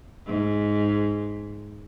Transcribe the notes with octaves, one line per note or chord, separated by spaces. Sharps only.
G#2